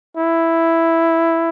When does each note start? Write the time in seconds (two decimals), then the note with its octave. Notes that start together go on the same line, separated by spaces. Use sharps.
0.17 E4